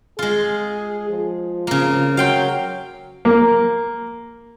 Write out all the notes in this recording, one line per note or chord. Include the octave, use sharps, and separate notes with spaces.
G#3 F4 G#4
F3
C#3 A#3
F#3 F5 G5 C6
A#3